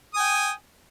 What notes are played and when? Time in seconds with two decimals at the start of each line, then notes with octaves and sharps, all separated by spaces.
0.14 D#6
0.17 G#5
0.19 G5